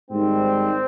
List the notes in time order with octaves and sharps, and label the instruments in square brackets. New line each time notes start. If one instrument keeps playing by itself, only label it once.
[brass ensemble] G#2 D#3 G3 C4